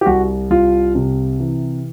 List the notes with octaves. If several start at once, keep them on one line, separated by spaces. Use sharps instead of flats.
G4
C2 F#4
C2 F4
C3
E3